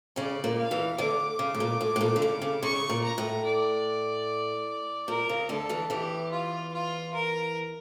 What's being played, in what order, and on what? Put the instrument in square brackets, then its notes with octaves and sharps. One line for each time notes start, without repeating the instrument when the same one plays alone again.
[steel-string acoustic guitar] C#3 C#4 [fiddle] D5
[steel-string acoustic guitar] A#2 A#3
[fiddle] F5
[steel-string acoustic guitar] E2 E3
[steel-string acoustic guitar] D2 D3 [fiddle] D6
[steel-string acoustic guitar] C#3
A2
A#2
A2
A2
A#2
D3
C#3
C#3
[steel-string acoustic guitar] C#3 [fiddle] C#6
[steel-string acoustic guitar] A#2
[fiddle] A#5
[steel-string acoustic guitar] A2
[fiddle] D5
[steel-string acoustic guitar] A#2 [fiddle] A#4
[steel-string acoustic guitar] C#3
[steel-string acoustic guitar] D2 D3 [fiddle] A4
[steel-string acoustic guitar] E2 E3
[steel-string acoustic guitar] E2 E3 [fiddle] G4
[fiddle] F4
F4
A#4